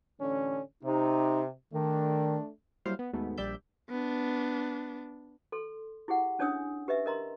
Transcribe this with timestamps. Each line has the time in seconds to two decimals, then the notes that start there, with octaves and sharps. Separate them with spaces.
0.20 A1 D3 C#4
0.83 C3 D#4
1.73 D#3 A3 D4
2.86 F#3 G3 A#3 E4 C5 F5
2.99 B3
3.13 D#2 G#2 B2 A3 B3
3.37 A#1 G3 D5 E5 G6
3.90 B3 D4
5.52 A4 C6
6.08 E4 G4 G#4 F#5
6.39 C#4 D4 C#5 G#5 D#6 E6
6.88 G4 B4 D#5 E5
7.06 A#4 D#5 A#5 C6